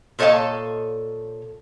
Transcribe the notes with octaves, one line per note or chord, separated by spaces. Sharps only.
A#2 A4 C#5 D#5 F5 A5